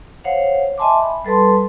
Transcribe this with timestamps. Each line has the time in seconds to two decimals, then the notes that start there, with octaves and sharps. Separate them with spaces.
0.24 C5 C#5 F5 F#5
0.78 D#5 E5 G#5 A5 C6 D6
1.02 B5
1.25 G3 A4 B4 A5 C6